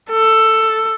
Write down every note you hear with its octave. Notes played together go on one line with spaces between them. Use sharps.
A4